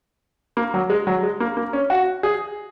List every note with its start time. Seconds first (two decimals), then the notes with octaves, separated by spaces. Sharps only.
0.57 A#3
0.74 F#3
0.90 G#3
1.07 F#3
1.23 G#3
1.40 A#3
1.57 A#3
1.73 C#4
1.90 F#4
2.23 G#4